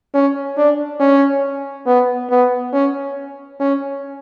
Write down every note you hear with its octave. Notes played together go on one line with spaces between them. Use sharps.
C#4
D4
C#4
B3
B3
C#4
C#4